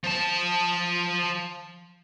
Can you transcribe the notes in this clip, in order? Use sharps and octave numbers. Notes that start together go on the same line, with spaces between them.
F3 A5